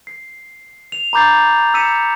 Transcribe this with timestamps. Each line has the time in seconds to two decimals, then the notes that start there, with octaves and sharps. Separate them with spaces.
0.07 C7
0.92 F7
1.13 A#5 B5 D6 G6 A6 C7
1.74 E6 B6 C#7 D#7 E7